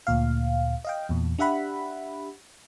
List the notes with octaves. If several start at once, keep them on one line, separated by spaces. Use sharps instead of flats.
D2 A#2 F5
D#5 F5 G5
E2 A#2
D4 G4 E5 F#5 B5